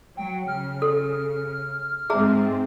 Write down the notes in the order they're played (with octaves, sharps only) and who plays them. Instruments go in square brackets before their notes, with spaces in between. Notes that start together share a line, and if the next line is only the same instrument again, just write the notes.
[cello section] F#3 [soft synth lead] G5
[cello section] C#3 [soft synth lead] F6
[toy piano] A4
[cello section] G#2 G#3 C4 [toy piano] G#4 E5 A#5